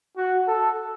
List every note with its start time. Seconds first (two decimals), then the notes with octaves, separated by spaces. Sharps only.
0.17 F#4
0.48 A4